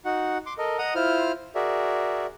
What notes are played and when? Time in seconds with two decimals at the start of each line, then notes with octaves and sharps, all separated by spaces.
0.05 D#4 F#4 F#5
0.46 C6 D6
0.58 A4 A#4 D#5
0.79 D#5 F#5 A#5 D#6
0.95 E4 F4 C5 F6
1.55 F#4 G#4 A#4 D5 E5